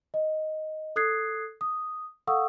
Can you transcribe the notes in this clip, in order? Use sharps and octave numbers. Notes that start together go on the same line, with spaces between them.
D#5
A4 D#6 F#6 G#6 C7
D#6
A4 F5 F#5 C#6 D#6 E6